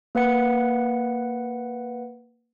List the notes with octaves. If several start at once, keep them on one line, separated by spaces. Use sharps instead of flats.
A#3 B4 F#5 C#7